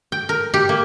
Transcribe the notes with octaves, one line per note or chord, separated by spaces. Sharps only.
G5
A#4
G4
A#3